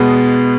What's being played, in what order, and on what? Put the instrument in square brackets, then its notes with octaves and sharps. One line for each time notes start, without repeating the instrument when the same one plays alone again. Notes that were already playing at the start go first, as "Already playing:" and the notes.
Already playing: [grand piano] B2 G#3 B3